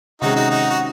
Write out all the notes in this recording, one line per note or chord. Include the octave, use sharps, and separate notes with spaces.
C3 D#3 G#3 C#4 D#4 F#4 G#4
D#4 F#4
D#4 F#4
F#4